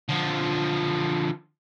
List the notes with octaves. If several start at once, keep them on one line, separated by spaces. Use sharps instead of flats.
D3 F3